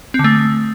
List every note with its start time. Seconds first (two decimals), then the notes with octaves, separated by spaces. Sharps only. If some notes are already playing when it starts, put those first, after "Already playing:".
0.14 C4
0.19 D3
0.24 A3